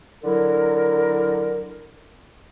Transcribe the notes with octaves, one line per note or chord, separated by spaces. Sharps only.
D3 F#3 E4 A#4